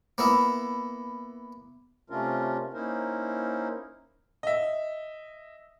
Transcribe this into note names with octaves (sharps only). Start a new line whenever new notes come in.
A#3 B3 E4
C3 A3 C#4 D4 F4 A#4
A#3 C#4 D#4 E4 A#4 C5
D#5 E5